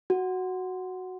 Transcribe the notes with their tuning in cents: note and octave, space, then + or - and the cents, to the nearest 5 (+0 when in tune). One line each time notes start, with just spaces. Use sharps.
F#4 +0